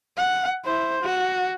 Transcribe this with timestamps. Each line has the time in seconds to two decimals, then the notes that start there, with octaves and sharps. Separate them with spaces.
0.17 F#5
0.65 E4 C5
1.02 F#4